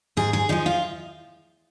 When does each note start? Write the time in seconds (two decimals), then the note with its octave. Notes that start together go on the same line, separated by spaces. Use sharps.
0.17 G#2 G#4
0.33 G#4
0.49 F3 G#3 D#4
0.66 F4